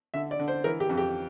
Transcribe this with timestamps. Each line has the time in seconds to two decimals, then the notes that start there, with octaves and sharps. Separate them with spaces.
0.14 D3 E5
0.31 D5
0.39 D3
0.48 C5
0.64 E3 A#4
0.80 G4
0.89 F2
0.98 G4